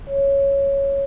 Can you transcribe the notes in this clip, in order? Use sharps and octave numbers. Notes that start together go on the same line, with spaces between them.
C#5